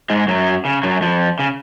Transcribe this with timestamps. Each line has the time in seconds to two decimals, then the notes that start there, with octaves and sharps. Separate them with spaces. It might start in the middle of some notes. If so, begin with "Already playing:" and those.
0.10 G#2 G#3
0.28 F#2 F#3
0.65 C#3
0.83 F#2 F#3
1.02 F2 F3
1.39 C#3